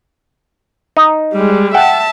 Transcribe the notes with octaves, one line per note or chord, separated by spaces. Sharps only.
D#4
G3 G#3
E5 F#5 G5 A5